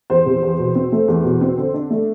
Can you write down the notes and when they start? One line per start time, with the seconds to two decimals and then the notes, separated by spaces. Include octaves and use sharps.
0.10 E2 C5
0.26 C3
0.43 E2
0.59 B2
0.75 C4
0.92 A3
1.08 E2
1.25 B2
1.41 C4
1.58 D3
1.74 D4
1.91 A3